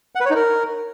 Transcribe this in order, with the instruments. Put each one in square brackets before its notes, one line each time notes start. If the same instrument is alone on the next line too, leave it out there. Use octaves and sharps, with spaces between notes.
[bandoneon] F#5
B4
C#5
D#4
A#4